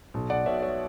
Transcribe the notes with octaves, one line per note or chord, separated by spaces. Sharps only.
B1
D5 F#5
B2 C#5 E5
C#5 E5